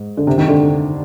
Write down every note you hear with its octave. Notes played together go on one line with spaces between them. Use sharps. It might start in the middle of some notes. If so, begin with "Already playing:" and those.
Already playing: G#2
D3
C3
D#3
D3